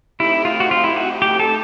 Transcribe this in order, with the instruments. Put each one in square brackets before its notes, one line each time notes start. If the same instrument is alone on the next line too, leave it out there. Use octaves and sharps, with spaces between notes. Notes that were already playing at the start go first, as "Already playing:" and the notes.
[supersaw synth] A3 C4 D#4 G4 [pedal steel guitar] E4
[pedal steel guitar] F4
F#4
F4
E4
F#4
G4
A4